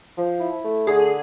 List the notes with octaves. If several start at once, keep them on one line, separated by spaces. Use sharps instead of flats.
F3
E4
A3
D3 G#4